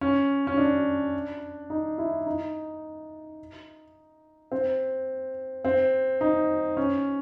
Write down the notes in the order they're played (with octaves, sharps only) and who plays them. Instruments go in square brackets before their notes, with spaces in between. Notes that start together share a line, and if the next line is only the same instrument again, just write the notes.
[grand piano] C#4
C#4
D4
D#4
E4
D#4
C4
C4
D#4
C#4